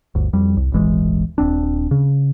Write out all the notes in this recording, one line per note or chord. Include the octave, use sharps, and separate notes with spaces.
G1 D2
F2 G3
C2
D#1 G#1 E3 G#3
D#1 C4 D4
C#3